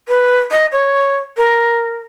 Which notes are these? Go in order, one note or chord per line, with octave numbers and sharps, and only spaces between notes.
B4
D#5
C#5
A#4